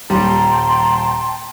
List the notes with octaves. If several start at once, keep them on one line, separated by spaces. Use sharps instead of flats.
D#1 G3 G5 A5 A#5 C6